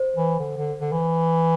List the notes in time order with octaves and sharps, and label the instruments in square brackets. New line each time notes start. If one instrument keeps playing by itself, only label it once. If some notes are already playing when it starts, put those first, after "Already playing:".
Already playing: [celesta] C5
[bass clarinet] E3
D3
D3
D3
E3